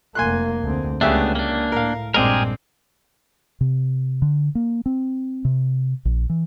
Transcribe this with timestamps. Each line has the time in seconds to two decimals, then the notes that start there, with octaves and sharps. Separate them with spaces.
0.15 F1 A#3 G#5 C6 F#6
0.62 D2 C4
1.01 C#2 C#3 A3 B3 D4 G4 E5
1.35 A#3 D4
1.72 A2 A#4 F5
2.14 A#1 G2 G#3 C4 D4 G4 G#4 A#4
3.61 C3
4.22 D3
4.55 A#3
4.86 C4
5.45 C3
6.05 A#1
6.30 E3